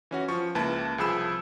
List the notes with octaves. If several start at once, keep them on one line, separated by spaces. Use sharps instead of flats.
E3 C#4 F#4
F3 C#6
C#2 A#3 E4 B4 A5
C2 F3 G#4 B5 E6 E7